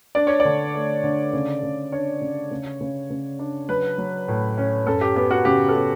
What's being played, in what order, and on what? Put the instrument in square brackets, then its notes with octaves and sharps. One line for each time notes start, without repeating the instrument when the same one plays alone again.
[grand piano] D4 D5
C#5
D5
D3
A3
D3
C#3
C#3
D4 C#5
C#3
C#3
C#3
C#3
D4
F#3 B4
F#3
A2
C#4
F#2 A4
G4
B3 G4
F#4
C#3 G4
A4
B3 G4